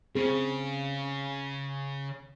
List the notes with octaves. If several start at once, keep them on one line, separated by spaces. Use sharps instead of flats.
C#3 C4 G#4